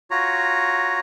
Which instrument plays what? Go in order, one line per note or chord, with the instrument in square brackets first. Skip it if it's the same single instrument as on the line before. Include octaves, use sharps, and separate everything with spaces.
[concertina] F4 F#4 C#5 A#5